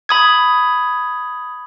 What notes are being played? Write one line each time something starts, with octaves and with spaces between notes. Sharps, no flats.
B5 D#6 G#6